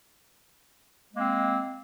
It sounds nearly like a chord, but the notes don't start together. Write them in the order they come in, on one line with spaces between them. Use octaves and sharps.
G#3 A#3 C4